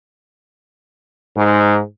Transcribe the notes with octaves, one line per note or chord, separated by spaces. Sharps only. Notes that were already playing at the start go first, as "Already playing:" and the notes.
G#2